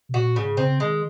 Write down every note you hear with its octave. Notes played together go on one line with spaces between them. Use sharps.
C3
A#2 F#4
G#2 C#3
C#3 C4
D#3 G#3